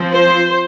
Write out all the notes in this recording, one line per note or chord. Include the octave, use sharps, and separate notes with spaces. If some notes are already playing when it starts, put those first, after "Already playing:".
Already playing: F3 C4
C5